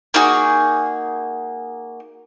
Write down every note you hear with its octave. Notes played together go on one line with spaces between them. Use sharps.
A#3 D#4 F#4 G#4